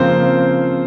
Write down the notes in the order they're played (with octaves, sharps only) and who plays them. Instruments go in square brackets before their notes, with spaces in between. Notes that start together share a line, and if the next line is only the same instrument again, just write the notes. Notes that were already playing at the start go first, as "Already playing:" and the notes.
Already playing: [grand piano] C#3 F3 A#3 C4 C5